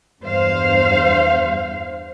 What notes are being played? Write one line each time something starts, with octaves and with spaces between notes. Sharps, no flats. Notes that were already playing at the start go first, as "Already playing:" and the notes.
E2 G2 C5 F5